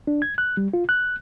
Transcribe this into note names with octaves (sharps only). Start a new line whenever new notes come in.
D4
G#6
F#6
G3
F4
F#6